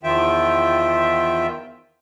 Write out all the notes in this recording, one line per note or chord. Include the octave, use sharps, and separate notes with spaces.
E2 D#3 F3 F4 E5 G5